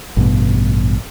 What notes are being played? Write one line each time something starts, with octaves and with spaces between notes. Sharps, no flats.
A1 G2 B2